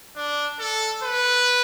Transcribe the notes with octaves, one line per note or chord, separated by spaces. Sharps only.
D4
A4
B4